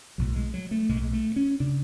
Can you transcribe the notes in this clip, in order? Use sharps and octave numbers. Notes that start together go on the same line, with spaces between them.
B1 A2 F#3
G#3
F#3
A3
B1 A2 G#3
A3
G#3
A3
C#4
C#3 D4